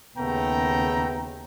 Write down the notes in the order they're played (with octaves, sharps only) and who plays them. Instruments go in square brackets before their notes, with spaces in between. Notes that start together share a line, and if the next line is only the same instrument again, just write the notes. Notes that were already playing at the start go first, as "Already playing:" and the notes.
[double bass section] D#2 C#3 [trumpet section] A3 G5 A#5 [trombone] B3